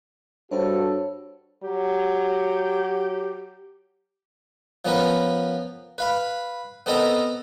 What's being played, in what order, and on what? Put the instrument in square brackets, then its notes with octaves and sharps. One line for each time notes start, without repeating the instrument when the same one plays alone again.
[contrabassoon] G2 [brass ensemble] F#4 A4 [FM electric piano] C5 C#5
[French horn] F#3 [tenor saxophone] G4
[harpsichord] F3 B3 C#4 A#4 B4
B4 F5 B5
B3 C4 A4 A#4 D#5 A#5